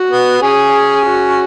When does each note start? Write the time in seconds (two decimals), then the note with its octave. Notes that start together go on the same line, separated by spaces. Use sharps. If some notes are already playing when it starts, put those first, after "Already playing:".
Already playing: F#4
0.11 B3
0.42 C#4 G#4
1.05 F#4